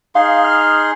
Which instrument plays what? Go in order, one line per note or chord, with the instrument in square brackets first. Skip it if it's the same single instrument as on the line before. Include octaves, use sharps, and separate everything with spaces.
[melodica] D#4 G#4 C6 [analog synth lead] F5
[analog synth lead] F6